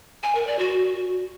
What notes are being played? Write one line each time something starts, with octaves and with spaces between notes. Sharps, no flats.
G#5
A#4
D5
F#4